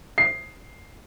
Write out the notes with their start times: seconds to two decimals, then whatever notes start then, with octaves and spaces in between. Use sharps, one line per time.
0.18 C7